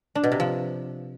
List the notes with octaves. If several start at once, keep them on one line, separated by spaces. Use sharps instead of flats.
D4
B2
C3
F3